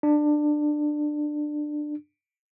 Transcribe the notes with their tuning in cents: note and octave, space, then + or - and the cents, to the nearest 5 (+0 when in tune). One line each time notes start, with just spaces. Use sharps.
D4 +20